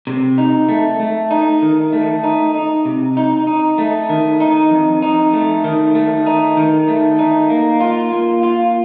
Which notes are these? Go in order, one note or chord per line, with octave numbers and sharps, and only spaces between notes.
C3
D#4
A3
A3
D#4
D#3
A3
D#4
D#4
C3
D#4
D#4
A3
D#3
D#4
F2
D#4
A3
D#3
A3
D#4
D#3
A3
D#4
A#3
F4
A#3
F4